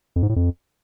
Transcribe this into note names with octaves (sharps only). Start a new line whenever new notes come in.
F2
G#2
A2
F2